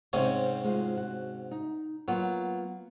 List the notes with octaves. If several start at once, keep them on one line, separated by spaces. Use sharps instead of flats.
G#2 C3 C4 C#4 C#5 D#5
G#3 F4 F#4
F#4
D#4
F#3 A#3 B3 F4